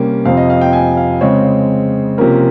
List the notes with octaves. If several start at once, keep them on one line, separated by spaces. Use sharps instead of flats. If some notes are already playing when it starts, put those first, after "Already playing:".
Already playing: C3 G3 A#3 C#4
F2 C3 F3 C4 F5
D#5
F5
G5
G#5
F5
C#3 G#3 C4 C#5
C3 F3 A#3 C#4 A#4